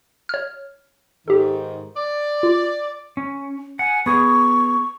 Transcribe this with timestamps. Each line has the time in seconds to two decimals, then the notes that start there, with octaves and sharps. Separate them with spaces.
0.29 C#5 F6
1.28 G#2 D#3 G4 A4
1.97 D5
2.43 F4
3.17 C#4
3.79 F#5 G#5
4.06 B3 G#4 C#6